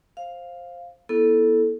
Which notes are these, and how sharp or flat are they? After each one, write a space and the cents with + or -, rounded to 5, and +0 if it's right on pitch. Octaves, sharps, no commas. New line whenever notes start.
C5 +15 F5 +0
B3 -25 E4 +0 A4 +0